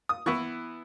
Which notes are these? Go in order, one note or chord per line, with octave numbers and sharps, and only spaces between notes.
D#6
E3 B3 E4 C#6